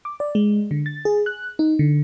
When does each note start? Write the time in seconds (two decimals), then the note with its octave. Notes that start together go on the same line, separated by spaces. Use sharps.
0.05 D6
0.20 D5
0.35 G#3
0.71 D3
0.86 A6
1.05 G#4
1.26 F#6
1.59 D#4
1.79 D3